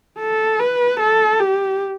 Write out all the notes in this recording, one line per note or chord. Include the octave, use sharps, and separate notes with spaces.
A4
B4
A4
G4